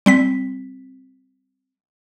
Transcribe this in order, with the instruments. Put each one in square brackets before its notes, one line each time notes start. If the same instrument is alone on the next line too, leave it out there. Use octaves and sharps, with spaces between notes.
[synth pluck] G3 C4 B6